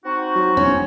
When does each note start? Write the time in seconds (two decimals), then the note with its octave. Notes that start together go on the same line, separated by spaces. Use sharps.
0.05 C4 D#4 F#4
0.36 F#3
0.57 E1 C#4